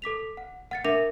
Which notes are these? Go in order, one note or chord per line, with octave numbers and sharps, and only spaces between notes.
A4 D6 B6 F7
F#5
F#5 A6 C#7
D4 A#4 E5 D6 A#6 F7